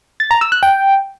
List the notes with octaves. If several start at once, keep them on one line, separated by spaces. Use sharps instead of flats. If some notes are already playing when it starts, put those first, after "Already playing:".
A6
A#5
E6
F#6
G5